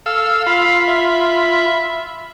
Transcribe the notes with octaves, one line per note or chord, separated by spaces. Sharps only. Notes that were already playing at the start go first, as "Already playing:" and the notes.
A4 F5 E6
F4 F5 B5
E5